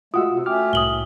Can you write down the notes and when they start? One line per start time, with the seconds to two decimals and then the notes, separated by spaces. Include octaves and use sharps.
0.14 G#3 A3 F4 F#4 F#5 D#6 E6
0.29 C3
0.46 A3 C#4 G5 D6 F6
0.73 C2 A2 D#6 F#7 G7